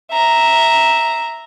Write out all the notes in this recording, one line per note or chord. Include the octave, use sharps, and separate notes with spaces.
E5 A#5